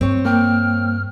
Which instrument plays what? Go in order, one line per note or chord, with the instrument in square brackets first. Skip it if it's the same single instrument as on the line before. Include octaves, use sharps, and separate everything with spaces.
[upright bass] G2 [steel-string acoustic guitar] C4 C#5
[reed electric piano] A#3 G5 [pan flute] F6